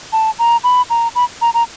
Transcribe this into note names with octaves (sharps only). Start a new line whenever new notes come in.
A5
A#5
B5
A#5
B5
A#5
A#5